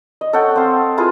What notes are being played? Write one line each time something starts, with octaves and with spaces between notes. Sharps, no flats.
D#5
A4 C#5 F#5 G5
C4 F5
E4 F4 G#4 B4